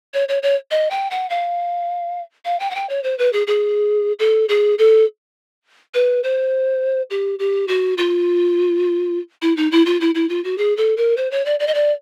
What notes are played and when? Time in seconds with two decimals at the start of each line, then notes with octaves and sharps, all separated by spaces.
0.14 C#5
0.29 C#5
0.43 C#5
0.71 D#5
0.91 G5
1.11 F#5
1.30 F5
2.45 F5
2.60 G5
2.71 F#5
2.75 G5
2.89 C#5
3.04 C5
3.19 B4
3.33 G#4
3.47 G#4
4.19 A4
4.49 G#4
4.78 A4
5.94 B4
6.24 C5
7.10 G4
7.39 G4
7.68 F#4
7.98 F4
9.42 E4
9.57 D#4
9.72 E4
9.86 F4
10.01 E4
10.15 E4
10.29 F4
10.44 F#4
10.58 G#4
10.77 A4
10.97 A#4
11.17 C5
11.31 C#5
11.46 D5
11.60 D5
11.67 D#5
11.74 D5